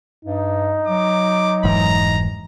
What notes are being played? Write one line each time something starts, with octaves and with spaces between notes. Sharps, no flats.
G2 D#4
F#3 D6
F1 G#2 E3 A#5